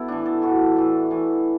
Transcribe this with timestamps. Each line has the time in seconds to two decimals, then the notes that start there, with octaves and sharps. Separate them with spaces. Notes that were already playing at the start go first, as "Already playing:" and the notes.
Already playing: B3 E4 F#4 A4
0.08 A2 E3 D4
0.26 A4
0.42 A2 E3 F#4
0.76 A2 E3
1.11 A2 E3